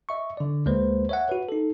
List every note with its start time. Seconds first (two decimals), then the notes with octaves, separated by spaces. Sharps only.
0.09 D#5 E5 C#6
0.37 D3 D5
0.66 D2 G#3 A#3 B4 C5
1.09 C#5 E5 F#5
1.29 F#4 B4
1.49 D#4 A4